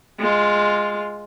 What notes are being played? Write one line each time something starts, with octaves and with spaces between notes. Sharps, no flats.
G#3 F4